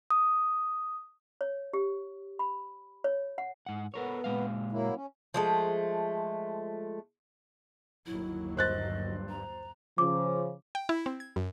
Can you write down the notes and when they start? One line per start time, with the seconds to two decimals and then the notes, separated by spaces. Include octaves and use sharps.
0.10 D#6
1.41 C#5
1.73 G4
2.39 B5
3.04 C#5
3.38 F#5
3.66 G#2 F#5
3.94 B3 A4 A#4 C#5
4.24 A#2 G#3 F5
4.72 F#3 A#3 E4
4.94 C#4
5.34 F3 G#3 A3
8.06 G1 D#2 F#3 E4
8.57 G2 C5 D#5 F#6 A6
9.29 A#5
9.98 C#3 F3 D6
10.75 G5
10.89 E4
11.06 C4
11.20 G#6
11.36 F#2